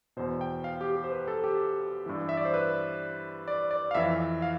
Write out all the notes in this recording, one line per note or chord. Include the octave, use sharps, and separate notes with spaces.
E2 B2 C5
G5
F5
G4
G4
C5
B4
A4
G4
G2 E3
E5
D5
C5
B4
D5
D5
F5
F2 E3 E5
F5